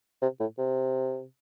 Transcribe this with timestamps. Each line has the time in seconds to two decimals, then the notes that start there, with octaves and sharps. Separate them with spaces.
0.22 C3
0.40 A2
0.58 C3